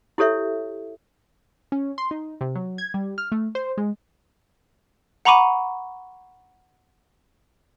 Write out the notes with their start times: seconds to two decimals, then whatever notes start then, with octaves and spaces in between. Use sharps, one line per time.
0.18 E4 G4 A4 C#5 E5
1.72 C#4
1.98 C6
2.11 D#4
2.41 C3
2.55 F#3
2.78 G#6
2.94 G3
3.18 F6
3.32 A3
3.55 C5
3.78 G#3
5.25 F#5 A#5 B5 C#6 D6 D#7